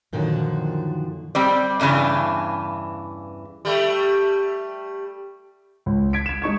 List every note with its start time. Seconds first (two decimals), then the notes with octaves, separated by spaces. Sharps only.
0.13 F#2 A#2 D3 D#3 F3 F#4
1.35 G3 C4 D5
1.80 E2 G2 C#3 E3 D4
3.65 G3 A3
5.86 C#2
6.13 G#6 B6 D7
6.26 G#6 E7
6.42 G#3 D#4 C#6 G#6